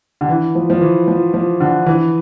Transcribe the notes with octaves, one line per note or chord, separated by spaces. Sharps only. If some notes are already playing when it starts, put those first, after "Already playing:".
D3
E3
F3
F3
E3
F3
F3
D3
E3